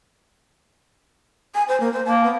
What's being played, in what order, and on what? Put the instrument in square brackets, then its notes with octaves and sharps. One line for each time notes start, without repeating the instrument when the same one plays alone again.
[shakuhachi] G#5
C5
A#3
C5
[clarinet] A#3 [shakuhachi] A5
[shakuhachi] B3